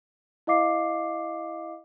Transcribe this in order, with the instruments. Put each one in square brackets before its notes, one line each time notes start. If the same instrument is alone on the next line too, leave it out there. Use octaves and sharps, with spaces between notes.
[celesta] E4 D#5 F5 D6 C7